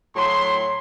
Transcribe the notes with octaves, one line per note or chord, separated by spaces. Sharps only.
A2 F#3 C6